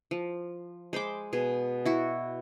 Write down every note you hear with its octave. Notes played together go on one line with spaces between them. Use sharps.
F3
G#3 C5 B5 D6
B2 G#4
E4 F#4